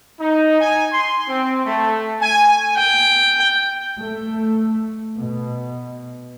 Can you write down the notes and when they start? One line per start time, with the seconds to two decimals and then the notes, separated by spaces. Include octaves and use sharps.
0.20 D#4
0.61 G#5
0.93 C6
1.28 C4
1.65 A3
2.21 G#5
2.77 G5
3.99 A3
5.17 B2